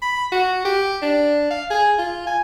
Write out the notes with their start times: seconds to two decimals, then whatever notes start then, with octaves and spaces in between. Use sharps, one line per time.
0.02 B5
0.32 F#4
0.65 G4
1.02 D4
1.51 F5
1.70 G#4
1.98 F4
2.27 G#5